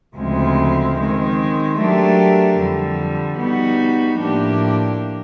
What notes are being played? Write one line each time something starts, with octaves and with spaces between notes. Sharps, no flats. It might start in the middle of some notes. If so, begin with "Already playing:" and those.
D2 C#3 F3 G#3 C4
D#3 G#3 C4
F#3 A3 D4 G4 A#4
F2 D3 G3
G3 B3 D#4 F#4
A2 F3 A#3 D4 G4